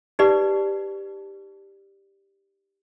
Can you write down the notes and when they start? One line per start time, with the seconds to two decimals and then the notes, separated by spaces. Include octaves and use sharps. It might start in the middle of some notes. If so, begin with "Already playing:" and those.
0.19 D#4 G4 B4 D5